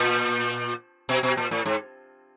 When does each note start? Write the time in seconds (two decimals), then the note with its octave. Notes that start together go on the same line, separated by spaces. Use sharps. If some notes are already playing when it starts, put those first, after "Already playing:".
Already playing: A#2
1.09 B2
1.23 B2
1.37 A#2
1.51 A2
1.66 G#2